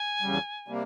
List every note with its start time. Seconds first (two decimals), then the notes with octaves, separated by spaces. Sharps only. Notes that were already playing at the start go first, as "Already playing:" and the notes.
Already playing: G#5
0.22 E2 C#3 G3
0.68 C3 G3 A#3